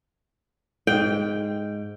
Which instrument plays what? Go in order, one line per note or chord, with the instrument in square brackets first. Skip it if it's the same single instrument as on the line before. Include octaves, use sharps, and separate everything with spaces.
[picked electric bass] G#2 [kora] G5